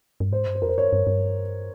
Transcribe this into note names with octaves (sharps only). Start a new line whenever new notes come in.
G2
G#2 C5
G2
C5
F2 A#4
C5
G2 C#5
G2
G2